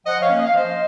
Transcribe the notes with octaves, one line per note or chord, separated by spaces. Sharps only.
F3 D#5 F#5
C#5 F5
A#3 C#4
D#5
F5
F3 C5 D#5